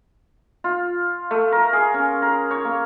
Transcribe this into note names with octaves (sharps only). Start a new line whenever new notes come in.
F4
A3
A#4
G#4
C#4
A#4
C#5
A#3